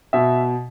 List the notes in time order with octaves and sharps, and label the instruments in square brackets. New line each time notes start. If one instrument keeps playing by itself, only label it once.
[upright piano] B2 E5